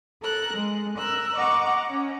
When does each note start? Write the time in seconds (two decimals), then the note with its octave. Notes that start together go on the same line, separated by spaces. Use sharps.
0.22 A4 A#4 F#6
0.53 G#3
0.98 A#4 E6 F#6
1.36 D#5 F#5 A#5 C#6 D6
1.89 C#4